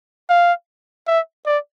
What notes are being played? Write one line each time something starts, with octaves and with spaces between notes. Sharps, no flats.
F5
E5
D5